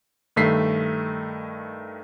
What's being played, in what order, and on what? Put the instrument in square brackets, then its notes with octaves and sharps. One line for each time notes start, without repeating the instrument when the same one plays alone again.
[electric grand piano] G2 D#3 A3 B6 C7